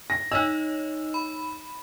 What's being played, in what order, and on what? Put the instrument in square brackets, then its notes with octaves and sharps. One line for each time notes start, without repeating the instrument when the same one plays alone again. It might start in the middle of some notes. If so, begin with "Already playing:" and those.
[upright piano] A#6
[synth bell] D#4 C#5 D#5 [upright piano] E6
[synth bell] B5